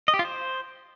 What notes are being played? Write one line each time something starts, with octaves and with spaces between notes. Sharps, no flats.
D#5
G4
F4
C5